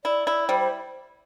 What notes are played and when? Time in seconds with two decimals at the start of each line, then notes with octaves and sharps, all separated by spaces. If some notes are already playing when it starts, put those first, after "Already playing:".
0.05 E4 D5
0.27 E4
0.49 G3 C5
0.60 C5